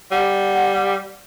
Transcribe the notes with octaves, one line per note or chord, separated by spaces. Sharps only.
G3 F#5